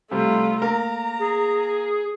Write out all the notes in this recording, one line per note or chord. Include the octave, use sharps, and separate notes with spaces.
C3 G3 A3 F4
A#3 A#4 A#5
G#4